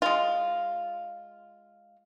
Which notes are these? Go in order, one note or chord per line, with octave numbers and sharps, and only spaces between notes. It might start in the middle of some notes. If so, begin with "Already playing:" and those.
G#3 F4